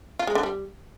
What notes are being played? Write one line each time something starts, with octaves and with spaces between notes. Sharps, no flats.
F4
G#3
D3
G3